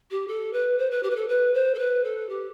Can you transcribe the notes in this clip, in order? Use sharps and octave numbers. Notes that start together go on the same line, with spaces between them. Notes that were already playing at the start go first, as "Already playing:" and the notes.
G4
A4
B4
C5
B4
G4
B4
A4
B4
C5
A4
B4
A4
G4